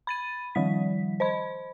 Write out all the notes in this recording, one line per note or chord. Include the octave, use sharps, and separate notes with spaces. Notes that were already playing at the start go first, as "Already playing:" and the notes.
B5 A6 D#7
D#3 F3 G3 B6
C5 D#5 B5